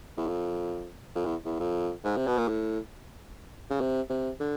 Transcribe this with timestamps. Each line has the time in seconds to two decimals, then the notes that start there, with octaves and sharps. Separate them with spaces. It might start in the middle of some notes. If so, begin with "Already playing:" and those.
0.17 E2
0.27 F2
1.15 F2
1.25 E2
1.45 E2
1.60 F2
2.04 G#2
2.17 C3
2.27 B2
2.38 A#2
2.48 A2
3.70 C#3
3.81 C3
4.10 C3
4.40 D3